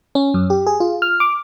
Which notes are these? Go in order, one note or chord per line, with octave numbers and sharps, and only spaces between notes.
C#4
F#2
G4
G#4
F4
F6
D6